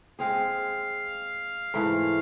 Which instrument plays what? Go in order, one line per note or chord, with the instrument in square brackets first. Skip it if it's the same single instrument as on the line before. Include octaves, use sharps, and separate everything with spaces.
[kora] G#3 C4 G#4 [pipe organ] F5
[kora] G#2 E3 A3